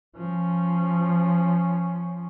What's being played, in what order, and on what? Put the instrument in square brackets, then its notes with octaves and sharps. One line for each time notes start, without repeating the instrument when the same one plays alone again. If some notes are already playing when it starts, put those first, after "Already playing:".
[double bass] F3 C#4